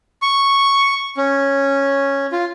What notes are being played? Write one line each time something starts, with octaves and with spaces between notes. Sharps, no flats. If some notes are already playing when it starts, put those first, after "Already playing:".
C#6
C#4
F4